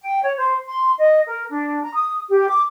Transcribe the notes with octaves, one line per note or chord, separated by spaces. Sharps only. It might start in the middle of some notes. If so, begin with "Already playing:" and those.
G5
C#5
C5
C6
D#5
A#4
D4
A#5
D#6
G4
D6